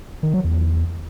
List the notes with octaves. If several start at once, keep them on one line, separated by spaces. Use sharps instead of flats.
D#3
F#3
E2